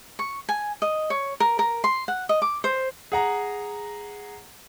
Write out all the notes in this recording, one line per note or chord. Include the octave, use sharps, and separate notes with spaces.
C#6
G#5
D#5
C#5
A#4
A#4
C6
F#5
D#5
D6
C5
G#4 F#5 A#5